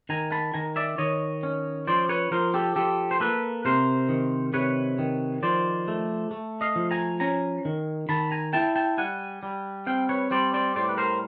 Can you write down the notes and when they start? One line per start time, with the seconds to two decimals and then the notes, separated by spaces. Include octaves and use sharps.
0.09 D#3 G#5 A#5
0.32 A5 B5
0.54 D#3 G#5 A#5
0.76 D5 E5
0.98 D#3 C#5 D#5
1.43 C#4
1.87 F3 C5 D5
2.09 B4 C#5
2.31 F3 A#4 C5
2.54 G4 A4
2.76 F3 G4 A4
3.11 C5
3.20 A#3 A4 B4
3.65 C3 A#4 C5
4.09 D#3
4.54 C3 B4 C#5
4.98 D#3
5.42 F3 C5 D5
5.88 A3
6.31 A3
6.61 D#5 F5
6.76 F3
6.91 G#5 A#5
7.20 C#4 G#5 A#5
7.65 D#3
8.09 D#3 A5 B5
8.31 G#5 A#5
8.53 E4 G5 A5
8.76 G5 A5
8.98 G3 F#5 G#5
9.43 G3
9.86 C4 F5 G5
10.09 B4 C#5
10.31 G3 C5 D5
10.54 C5 D5
10.76 A2 C5 D5
10.89 B4
10.97 A#4 C5